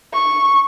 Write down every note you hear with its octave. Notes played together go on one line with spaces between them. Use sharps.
C#6